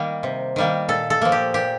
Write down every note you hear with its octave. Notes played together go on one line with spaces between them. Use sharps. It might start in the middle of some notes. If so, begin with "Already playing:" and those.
Already playing: D#3 G3 A#3
C3
D#3 G3 A#3
A#2 A4
A4
F3 A#3
G4
A#2 G4